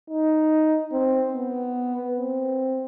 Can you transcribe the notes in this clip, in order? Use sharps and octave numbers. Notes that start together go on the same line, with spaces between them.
D#4
C4
B3
C4